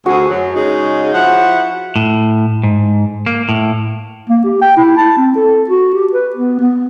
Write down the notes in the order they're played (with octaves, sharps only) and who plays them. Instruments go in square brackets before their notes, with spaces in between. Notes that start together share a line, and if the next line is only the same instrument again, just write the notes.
[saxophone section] D2 C4 G#4 [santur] F#4
[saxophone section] F#2 F#3
C#3 G#3 D#4
F3 E4 F#5
[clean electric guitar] A2
G#2
A#3
A2
[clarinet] A#3
G4
G5
E4
A5
C4
A4
F#4
G4
B4
B3
B3